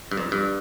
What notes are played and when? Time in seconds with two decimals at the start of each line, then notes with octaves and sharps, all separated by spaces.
0.11 G2
0.17 F2
0.32 G2